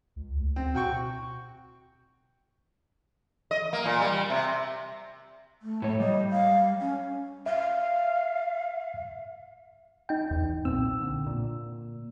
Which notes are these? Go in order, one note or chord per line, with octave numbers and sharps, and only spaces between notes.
C#2
D2
C4
B2 F#4 G5 C#6
D#5
A#3
A#2
G3
C3
A3
A2 C#5
G3 D#5
F5
C#4
E5 F5
D#4 G5
E2
B1 A#2 C4 E6
D3
A#2